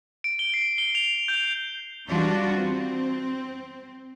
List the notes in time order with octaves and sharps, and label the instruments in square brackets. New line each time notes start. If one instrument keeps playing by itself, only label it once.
[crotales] D7
G7
C7
G7
F7
G6
[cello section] E3 G3 D4 F4 F#4
C4